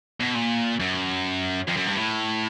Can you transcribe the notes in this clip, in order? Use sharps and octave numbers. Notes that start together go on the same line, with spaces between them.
B2
A#2
F#2
F2
F#2
G2
A2